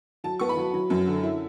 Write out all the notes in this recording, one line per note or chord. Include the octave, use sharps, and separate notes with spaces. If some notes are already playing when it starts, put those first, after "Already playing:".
F#3 A5
B3 C#6
B5
F#3
F#3
F#2
D3
E4